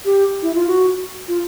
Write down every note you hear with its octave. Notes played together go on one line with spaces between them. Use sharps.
G4
E4
F4
F#4
F4